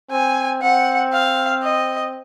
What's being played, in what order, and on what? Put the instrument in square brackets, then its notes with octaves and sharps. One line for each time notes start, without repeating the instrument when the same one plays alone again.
[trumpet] C4 [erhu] G#5
[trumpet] C4 [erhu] F#5
[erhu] F5
D#5